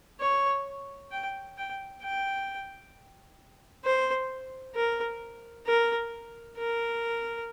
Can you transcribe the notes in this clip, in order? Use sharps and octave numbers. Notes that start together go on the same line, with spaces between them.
C#5
G5
G5
G5
C5
A#4
A#4
A#4